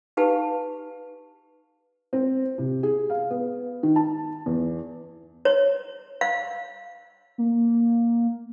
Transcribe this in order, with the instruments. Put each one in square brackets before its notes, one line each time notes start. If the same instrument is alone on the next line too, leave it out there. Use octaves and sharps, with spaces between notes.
[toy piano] D#4 G4 B4 F5 A5
[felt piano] C4
C3
G#4
F5
B3
D#3
A5
E2
[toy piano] C#5
F5
[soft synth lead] A#3